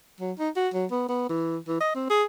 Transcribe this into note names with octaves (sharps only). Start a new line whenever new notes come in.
F#3
D#4
F#4
F#3
B3
B3
E3
E3
D#5
C4
G#4